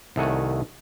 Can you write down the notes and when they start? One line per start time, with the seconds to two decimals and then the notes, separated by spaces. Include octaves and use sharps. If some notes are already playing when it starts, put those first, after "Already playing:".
0.16 C2 D#3 A3 F#5 G#5